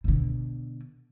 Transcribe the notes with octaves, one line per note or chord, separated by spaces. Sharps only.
B2 D3